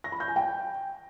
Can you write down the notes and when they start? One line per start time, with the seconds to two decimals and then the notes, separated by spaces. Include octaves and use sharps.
0.04 A#6
0.12 B5
0.20 G6
0.28 G#5
0.36 G5